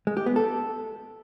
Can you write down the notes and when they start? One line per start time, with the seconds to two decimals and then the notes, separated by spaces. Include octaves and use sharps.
0.07 G#3
0.17 G4
0.26 B3
0.36 A4